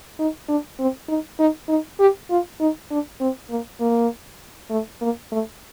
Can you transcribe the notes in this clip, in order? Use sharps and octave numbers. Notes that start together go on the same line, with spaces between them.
D#4
D4
C4
D#4
D#4
D#4
G4
F4
D#4
D4
C4
A#3
A#3
A3
A#3
A3